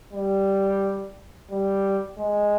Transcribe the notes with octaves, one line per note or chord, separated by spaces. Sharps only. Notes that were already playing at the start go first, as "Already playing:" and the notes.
G3
G3
G#3